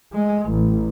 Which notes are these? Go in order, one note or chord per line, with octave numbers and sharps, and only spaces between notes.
G#3
A1